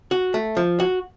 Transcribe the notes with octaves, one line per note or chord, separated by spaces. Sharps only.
F#4
A3
F3
F#4